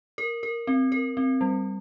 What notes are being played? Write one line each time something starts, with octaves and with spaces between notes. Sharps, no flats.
A#4
A#4
C4
A#4
C4
G3